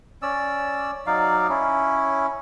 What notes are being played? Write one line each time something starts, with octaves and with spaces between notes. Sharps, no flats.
C#4 D5 E6
F#3 D#4 D5 F5
C#4 E4